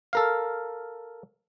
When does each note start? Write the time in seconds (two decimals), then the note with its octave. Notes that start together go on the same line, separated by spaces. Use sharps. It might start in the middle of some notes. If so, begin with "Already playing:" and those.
0.13 A4 A#4 F5